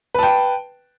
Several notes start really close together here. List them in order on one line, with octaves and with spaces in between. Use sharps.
B4 A5 G5